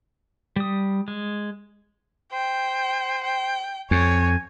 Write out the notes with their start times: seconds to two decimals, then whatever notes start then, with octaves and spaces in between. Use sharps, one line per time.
0.56 G3 D#6
1.08 G#3
2.32 C5 G5
3.24 G5
3.91 F2 C#5 G#5